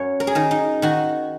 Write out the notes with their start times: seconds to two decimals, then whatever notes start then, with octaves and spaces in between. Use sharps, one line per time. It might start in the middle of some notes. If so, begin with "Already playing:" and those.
Already playing: F#2 C#5
0.20 A#4
0.27 G#4
0.35 D#3 A#4
0.51 D#4
0.82 D#3 F#4